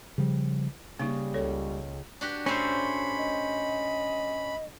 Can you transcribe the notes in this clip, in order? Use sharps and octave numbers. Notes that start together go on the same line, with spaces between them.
C#3 F3 G3
C#3 G3 A#3 D#4
C#2 A4 C#5
D4 F#4 G4
A2 A3 C#4 A4 C5 B5
D#5